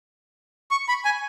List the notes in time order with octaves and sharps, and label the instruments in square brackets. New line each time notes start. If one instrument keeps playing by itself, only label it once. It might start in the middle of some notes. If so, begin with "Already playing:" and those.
[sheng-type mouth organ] C#6
B5
G#5